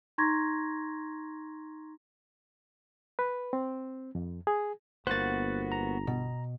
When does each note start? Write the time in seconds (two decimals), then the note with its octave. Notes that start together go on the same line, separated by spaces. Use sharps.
0.18 D#4 A#5 C6 C#6 G#6 A#6
3.19 B4
3.53 C4
4.15 F2
4.47 G#4
5.07 G1 A#3 B3 F#4 C5 F#6 A6
5.72 A#5
6.07 B2